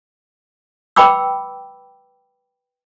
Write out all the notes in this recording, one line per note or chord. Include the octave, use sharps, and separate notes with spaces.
B4 G5 B5 D6 E6